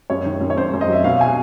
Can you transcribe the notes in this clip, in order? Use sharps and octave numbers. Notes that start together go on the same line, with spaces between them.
F#2 C#5
D#3
F#2
C#5
F#2 C5
F#2
D#5
F#3 E5
B2 F5
G#5